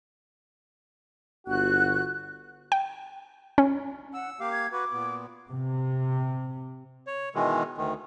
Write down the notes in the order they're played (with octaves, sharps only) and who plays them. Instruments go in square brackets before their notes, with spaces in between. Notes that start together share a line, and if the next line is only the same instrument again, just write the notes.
[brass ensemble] G1 F#4 [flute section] F#6
[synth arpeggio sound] G5
C#4
[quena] F#5 [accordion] E6
[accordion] A#3 G4 F5 [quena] D6
[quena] G#6
[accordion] F#4 B4 [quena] D6
[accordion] A#2 B3
[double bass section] C3
[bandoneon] C#5
B2 D#3 E3 G#3
D2 D#3